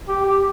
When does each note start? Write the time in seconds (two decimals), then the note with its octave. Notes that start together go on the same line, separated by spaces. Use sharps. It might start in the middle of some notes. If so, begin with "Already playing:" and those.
0.08 G4
0.26 G4